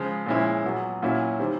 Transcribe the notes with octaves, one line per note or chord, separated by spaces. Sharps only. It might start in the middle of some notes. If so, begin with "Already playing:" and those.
Already playing: C#3 F3 G#3
A#2 F3 G#3 C#4 E4
A#2 F#3 B3
A#2 F#3 A#3 C#4 E4
D#3 G3 C4